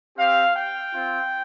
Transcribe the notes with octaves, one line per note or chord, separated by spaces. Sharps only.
C4 G4 F5
G5
C4 F4